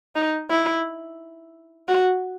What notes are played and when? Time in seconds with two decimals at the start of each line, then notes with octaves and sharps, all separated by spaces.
0.16 D#4
0.50 E4
1.88 F#4